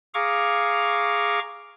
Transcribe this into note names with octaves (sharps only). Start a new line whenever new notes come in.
G#4 F5 A#5 C#6 D6